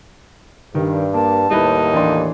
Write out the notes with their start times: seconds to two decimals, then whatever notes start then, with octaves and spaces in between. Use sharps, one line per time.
0.75 G2 D#3
1.14 A#3 A5
1.51 D#2 A2 G3 D#4 E4 B4
1.94 E3 D4 C6